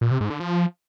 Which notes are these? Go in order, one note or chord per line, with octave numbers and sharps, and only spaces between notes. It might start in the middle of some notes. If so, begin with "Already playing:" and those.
A#2
C3
G#2
D3
F3